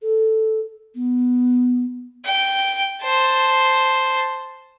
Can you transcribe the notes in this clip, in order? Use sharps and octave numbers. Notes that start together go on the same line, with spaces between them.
A4
B3
G5
C5 A5